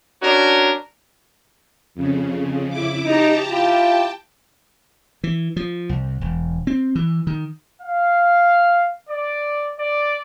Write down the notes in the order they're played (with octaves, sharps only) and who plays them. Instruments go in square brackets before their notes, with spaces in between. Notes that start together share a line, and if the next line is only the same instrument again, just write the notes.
[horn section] C#4 D4 F#4 A#4
[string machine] F2 C#3
E4 D6
[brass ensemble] D#4 [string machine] G4 A5 A#5
[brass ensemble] E4 F4 G4 [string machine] G5 A5
[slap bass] E3
F3
C2
E1
C4
E3
D#3
[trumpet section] F5
D5
D5